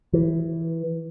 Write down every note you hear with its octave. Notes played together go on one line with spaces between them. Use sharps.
E3